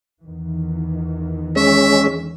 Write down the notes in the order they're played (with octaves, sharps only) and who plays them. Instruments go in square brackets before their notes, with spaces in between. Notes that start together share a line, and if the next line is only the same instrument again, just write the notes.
[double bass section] E2 D#3 E3
[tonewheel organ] G#3 C#4 [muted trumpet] E5